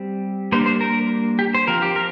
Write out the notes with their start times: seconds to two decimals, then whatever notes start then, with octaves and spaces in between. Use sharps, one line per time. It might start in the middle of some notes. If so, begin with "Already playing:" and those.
Already playing: G3 C4
0.52 G3 A#3 D4 C5
0.66 C5
0.81 A#4
1.39 G4
1.54 C5
1.67 F3 C4 A#4
1.82 G4
1.96 A#4